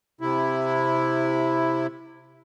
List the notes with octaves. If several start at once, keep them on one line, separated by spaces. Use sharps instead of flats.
C3 E4